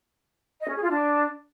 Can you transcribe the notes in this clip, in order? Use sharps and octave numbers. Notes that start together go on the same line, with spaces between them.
D#5
C#4
G#4
F4
D4